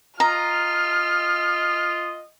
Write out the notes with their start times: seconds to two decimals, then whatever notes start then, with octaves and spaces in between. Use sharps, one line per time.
0.20 F4 D#5 A#5 F6